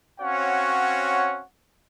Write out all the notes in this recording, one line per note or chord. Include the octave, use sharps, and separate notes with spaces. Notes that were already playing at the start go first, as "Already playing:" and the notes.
C4 C#4 F#4 C#5 F5 F#5